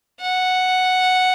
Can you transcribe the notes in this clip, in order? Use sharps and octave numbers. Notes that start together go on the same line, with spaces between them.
F#5